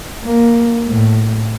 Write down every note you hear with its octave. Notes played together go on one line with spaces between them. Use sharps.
A#3
A2